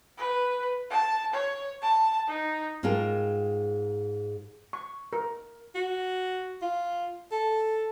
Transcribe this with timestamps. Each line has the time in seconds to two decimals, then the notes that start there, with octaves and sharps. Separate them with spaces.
0.18 B4
0.90 A5
1.33 C#5
1.82 A5
2.27 D#4
2.83 G#2 F4 G#4 A#4 G5 A5
4.73 C#6
5.13 A#4
5.75 F#4
6.62 F4
7.32 A4